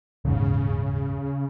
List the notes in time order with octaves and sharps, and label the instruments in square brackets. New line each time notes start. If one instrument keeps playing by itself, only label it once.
[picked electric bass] D#1 E2 G#2 [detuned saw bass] C#3